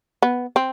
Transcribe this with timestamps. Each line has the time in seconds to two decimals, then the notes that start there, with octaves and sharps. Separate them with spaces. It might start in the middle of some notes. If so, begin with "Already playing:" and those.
0.22 B3
0.56 C4